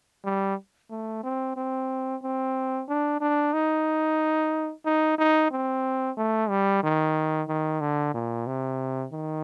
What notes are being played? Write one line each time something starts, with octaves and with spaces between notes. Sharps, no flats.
G3
A3
C4
C4
C4
D4
D4
D#4
D#4
D#4
C4
A3
G3
D#3
D#3
D3
A#2
C3
D#3